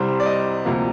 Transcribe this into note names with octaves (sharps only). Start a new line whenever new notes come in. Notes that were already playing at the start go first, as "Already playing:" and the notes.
Already playing: C2 C3 G3 C4 C5
D5
D#5
D2 C3 F3 A#3